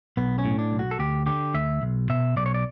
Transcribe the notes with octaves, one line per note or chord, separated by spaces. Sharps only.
B1 B3
C#4
A2
D4
B1
F#4
A4
D2 G4
D3 G4
D2 E5
B1
B2 E5
B1 D5
C#5
D5